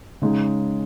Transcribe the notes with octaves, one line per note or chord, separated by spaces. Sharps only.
C#3 G#3 D#4